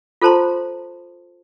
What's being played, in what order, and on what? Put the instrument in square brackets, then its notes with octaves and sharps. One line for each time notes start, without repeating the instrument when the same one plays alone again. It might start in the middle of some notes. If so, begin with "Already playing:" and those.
[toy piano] F4 A4 C5 A5 A#5 C6